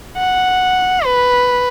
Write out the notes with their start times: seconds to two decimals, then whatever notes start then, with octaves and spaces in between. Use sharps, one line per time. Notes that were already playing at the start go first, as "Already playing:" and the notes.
0.17 F#5
1.05 B4